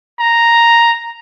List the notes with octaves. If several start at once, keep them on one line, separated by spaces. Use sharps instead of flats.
A#5